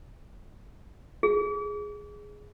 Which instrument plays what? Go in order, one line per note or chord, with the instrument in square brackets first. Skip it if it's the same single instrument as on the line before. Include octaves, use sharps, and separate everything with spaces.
[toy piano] G#4